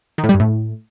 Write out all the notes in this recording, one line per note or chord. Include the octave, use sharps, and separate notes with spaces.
D#3
A2
G3
G2
A2